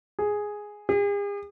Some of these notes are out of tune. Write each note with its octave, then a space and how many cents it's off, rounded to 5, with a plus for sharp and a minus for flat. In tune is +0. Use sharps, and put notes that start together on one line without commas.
G#4 +0
G#4 -45